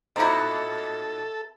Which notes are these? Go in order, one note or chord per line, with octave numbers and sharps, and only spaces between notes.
A2 C4 D#4 E4 F#4 A4 D#5 A#5